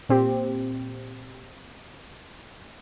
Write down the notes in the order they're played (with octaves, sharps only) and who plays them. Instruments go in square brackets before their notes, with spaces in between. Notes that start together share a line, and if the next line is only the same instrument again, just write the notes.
[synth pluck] A#2 C4 G4